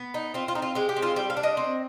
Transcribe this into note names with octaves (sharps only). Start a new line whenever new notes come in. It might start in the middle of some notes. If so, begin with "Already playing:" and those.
Already playing: B3
D#4
C4 F4
F4
D#4
F4
G#3 G4
G4
C4
F4
G3 G4
F5
D4
D#5
C4